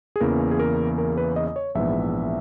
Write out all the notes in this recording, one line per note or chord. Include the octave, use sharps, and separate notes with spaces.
G#4
E2 C#3 E3 A#3 A#4
G#4
A#4
A#4
B4
D#5
D#5
C#5
A#1 G#2 E3 B3 E5